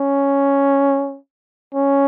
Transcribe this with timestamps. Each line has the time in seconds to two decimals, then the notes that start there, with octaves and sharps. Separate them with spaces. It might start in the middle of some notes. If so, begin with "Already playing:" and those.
Already playing: C#4
1.75 C#4